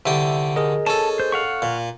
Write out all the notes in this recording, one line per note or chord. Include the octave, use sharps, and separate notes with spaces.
C2 D3 G4 E5
G#4 A#4 D#5
C#4 A4 A5
C5
F5 F#5 C#6
A#2